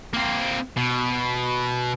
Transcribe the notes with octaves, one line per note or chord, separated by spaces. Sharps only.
A#3 C4
B2